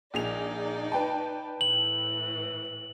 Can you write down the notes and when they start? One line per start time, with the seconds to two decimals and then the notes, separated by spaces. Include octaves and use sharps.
0.14 A#1 D#4 G#4 D5 F7
0.92 B4 G5 A5
1.61 A2 E3 F#7